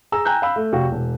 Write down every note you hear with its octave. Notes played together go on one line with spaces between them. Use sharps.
G#4 A#5 E6
G5 G#5 A#5 F#6 G6
F5 B5 E6
A3
F1 F#4 F5 G5
E1